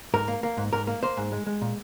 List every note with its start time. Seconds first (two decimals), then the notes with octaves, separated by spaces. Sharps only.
0.14 G#2 A#4
0.28 A#3
0.43 A#3
0.57 G#2
0.73 G#2 A#4
0.87 A#3
1.03 A#3 C5
1.17 G#2
1.32 G#3
1.47 G#3
1.62 A#2